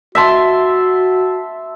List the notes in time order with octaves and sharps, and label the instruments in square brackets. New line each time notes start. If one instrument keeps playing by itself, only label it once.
[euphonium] F#4 [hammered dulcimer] E5 A5 C6